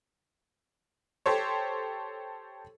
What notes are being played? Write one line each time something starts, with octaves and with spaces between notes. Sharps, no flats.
G4 A4 C5 C#5